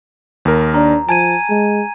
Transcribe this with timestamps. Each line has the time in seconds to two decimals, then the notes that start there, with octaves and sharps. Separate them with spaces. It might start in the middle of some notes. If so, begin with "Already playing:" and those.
0.45 D#2 A#4
0.74 D4 A#5
1.09 F3 G#5 A5 G#6 D#7
1.49 G#3